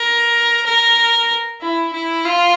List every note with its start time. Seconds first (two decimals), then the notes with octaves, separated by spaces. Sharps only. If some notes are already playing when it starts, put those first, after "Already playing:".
Already playing: A#4
0.65 A#4
1.61 E4
1.92 E4
2.25 F4